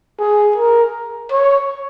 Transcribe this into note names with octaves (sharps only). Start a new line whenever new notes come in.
G#4
A#4
C#5